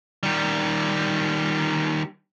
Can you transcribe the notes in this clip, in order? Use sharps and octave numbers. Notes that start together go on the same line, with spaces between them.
D#3 G3